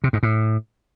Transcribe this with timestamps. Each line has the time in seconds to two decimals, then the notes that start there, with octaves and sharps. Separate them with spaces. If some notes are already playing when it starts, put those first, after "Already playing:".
0.04 C3
0.13 G#2
0.23 A2